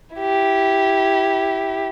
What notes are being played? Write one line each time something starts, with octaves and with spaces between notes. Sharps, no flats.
E4 G4